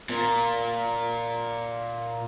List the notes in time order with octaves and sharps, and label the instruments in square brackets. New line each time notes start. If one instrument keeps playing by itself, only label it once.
[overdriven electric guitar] A#2 A#3